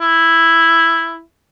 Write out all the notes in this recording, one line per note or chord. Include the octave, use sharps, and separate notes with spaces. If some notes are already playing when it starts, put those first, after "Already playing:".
E4